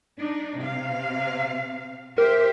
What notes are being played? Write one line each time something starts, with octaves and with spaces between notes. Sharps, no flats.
D4 D#4
C3 F5
G4 A#4 C5 E5